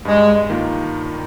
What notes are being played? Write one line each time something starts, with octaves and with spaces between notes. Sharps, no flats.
G2 G#3
D#3 A#3 F4 A#4